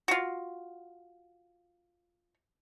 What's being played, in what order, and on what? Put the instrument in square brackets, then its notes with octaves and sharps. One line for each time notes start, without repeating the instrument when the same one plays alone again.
[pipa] F4 F#4